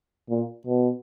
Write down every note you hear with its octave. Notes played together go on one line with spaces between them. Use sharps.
A#2
B2